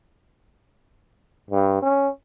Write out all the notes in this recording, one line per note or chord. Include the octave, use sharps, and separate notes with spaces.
G2
C#4